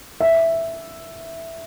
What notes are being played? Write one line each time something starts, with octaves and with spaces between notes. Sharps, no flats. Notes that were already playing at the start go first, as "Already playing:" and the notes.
E5